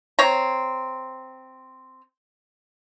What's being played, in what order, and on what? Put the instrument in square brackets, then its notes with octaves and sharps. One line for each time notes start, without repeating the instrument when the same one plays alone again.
[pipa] C4 C#5 A#5